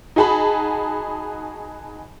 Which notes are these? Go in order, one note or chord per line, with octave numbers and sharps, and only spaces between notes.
D#4 F#4 G#4 A5 B5